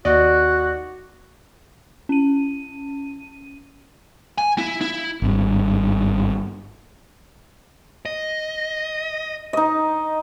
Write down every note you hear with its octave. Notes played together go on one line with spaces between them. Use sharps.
D#2 F#4 D5 D#5
C#4 D#7
G#5
E4
E4
G#1 G2
D#5
D#4 D#5